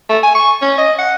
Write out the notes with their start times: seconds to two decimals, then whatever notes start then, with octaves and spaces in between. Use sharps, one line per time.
0.09 A3
0.23 G#5
0.35 C#6
0.62 C#4
0.78 D#5
0.99 F#5